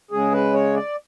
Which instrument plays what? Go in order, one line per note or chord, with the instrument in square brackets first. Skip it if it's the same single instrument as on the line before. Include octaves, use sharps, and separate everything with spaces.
[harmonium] C#3 G#3 G#4
B4
C#5
D5